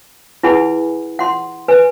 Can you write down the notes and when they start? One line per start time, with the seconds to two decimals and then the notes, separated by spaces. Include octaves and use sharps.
0.43 E4 G#4 B4 F#5 G#5 B5
1.19 F#5 C6
1.68 B4 G#5